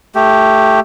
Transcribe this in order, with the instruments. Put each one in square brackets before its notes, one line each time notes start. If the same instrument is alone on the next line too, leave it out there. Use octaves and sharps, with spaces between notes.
[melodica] A3 G4